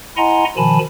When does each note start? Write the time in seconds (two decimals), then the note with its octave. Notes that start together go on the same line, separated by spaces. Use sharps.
0.17 E4 D#5 F#5 G#5 A#5 C6
0.57 B2 D#3 F3 G#5 A5 B5